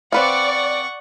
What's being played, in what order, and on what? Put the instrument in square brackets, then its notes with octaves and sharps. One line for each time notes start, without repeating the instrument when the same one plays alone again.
[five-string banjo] C4 B4 F5 [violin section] D5 [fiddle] F#5 C#6